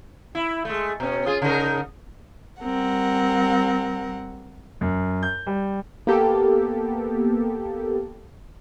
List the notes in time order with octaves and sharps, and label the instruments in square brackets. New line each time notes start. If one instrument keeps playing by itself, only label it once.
[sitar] E4
G#3 A3
B2 C#4
F4 G#4
C#3 D#4 A#4
[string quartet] G3 C4 A#4 F#5
[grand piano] F#2
G6
G3
[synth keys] A#3 B3 G4 A4